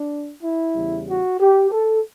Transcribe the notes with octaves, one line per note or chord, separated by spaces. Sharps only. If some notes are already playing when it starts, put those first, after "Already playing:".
Already playing: D4
E4
E2 C#3 G3
F#4
G4
A4